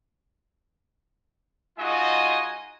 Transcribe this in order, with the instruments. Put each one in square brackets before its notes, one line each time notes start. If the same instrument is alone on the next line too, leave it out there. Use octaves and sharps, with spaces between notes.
[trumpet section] G#3 D#4 F4 F#4 D#5 G#5